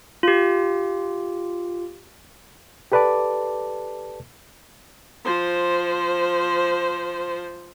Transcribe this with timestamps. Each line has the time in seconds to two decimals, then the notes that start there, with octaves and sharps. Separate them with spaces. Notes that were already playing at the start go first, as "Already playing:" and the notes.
0.23 F4 G4
2.92 G4 A4 B4 D5 A5 D6
5.24 F3 C5